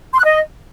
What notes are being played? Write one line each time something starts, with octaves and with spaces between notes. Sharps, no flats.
C6
F#6
D#5